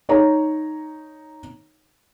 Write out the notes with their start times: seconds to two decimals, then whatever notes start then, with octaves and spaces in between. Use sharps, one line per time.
0.09 D#4 C#5 A#5